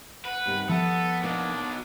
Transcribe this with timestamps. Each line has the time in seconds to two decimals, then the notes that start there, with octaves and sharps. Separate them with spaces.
0.25 B4 F#5
0.46 G2 C3 D#3
0.69 F3 B3 A4 E5
1.23 B2 F#3 A#3 D4 D#4